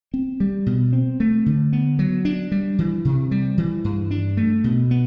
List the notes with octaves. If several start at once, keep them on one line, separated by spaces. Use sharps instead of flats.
C4
G3
B2
C4
A3
D3
B3
F#3
D4
G3
E3
C3
G3
E3
G2
D4
A3
B2
B3